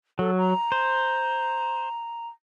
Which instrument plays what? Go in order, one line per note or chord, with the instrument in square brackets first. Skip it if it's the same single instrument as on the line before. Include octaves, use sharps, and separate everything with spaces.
[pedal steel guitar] F#3 [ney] A4
[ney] A#5
[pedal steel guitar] C5